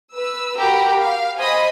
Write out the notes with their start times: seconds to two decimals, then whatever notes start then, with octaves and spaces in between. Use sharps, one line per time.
0.15 B4 E6
0.58 F#4 G4 A#4 A#5 B5
0.98 F5
1.40 C5 D#5 G#5 B5 D#6